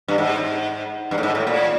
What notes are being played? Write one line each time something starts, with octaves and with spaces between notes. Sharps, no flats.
G2
G#2
G2
A2
G#2
A2
A#2